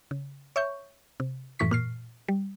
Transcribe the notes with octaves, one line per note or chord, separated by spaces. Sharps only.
C#3
C#5 E5 C#6 G6
C3
F#2 A2 E3 C#6 B6
A#2 F6 C7
G3